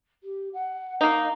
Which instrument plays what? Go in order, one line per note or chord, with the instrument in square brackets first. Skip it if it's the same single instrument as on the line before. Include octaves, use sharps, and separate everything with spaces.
[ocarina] G4
F#5
[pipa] A#3 D#4 [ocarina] F5